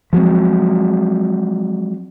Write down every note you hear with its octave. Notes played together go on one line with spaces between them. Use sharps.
F3 F#3 G#3 C4